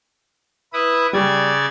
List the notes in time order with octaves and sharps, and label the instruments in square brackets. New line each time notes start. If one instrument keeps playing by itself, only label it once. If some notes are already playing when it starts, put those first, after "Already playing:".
[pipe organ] E4 B4 D#6
[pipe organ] C#3 D5 G#6 [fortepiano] G3